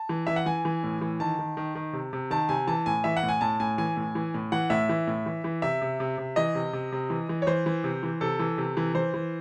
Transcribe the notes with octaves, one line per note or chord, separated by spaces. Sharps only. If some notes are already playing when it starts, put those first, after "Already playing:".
Already playing: A5
E3
E3 E5
F#5
E3 G#5
E3
A2
E3
D#3 A5
D#3
D#3
D#3
C3
C3
D#3 A5
C3 G#5
E3 A5
A2 G#5
E3 E5
F#5
A2
G#5
A2 A5
A2 G#5
E3 G#5
A2
E3
A2
E3 F#5
A2 E5
E3
A2
E3
E3
C3 E5
C3
C3
C3
E3 D#5
C3
C3
C3
E3
E3
C#5
E3 C5
E3
C3
E3
C3 A4
E3
C3
E3
E3 C5
E3